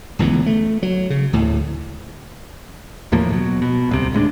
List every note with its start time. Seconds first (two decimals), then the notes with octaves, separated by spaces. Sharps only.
0.19 D1 C#2 E3 B3
0.46 A3
0.83 F#3
1.10 C#3
1.33 D2 A2
3.12 D#2 A2 F3 A#3
3.31 B2 F#3
3.62 B2
3.89 D1 C2 C3
4.13 D#1 A2 G#3 D4